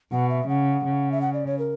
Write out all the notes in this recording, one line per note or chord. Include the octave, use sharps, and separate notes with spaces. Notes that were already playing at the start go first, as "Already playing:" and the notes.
B2 F#5
E5
C#3 F#5
C#3
E5
F#5
D5
C#5
A#4